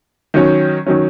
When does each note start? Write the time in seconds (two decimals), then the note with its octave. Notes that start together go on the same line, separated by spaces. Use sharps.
0.34 D#3 F#3 C#4
0.86 D#3 F#3 C#4